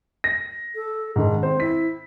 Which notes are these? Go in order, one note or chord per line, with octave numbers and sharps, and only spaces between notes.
A#6
A4
G#2 D#3 D4
C4 C5
E4 B6